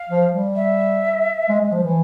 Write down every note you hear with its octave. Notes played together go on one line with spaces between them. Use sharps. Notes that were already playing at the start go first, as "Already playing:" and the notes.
Already playing: F5
F3
G3
E5
G#3
G#3
F3
E3